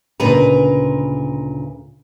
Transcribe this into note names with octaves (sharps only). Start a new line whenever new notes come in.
D2 A#2 C#3 A#4 B4 A#5